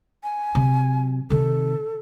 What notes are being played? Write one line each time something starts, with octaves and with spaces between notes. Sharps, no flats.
G#5
C3 F#3
C3 D#3 A4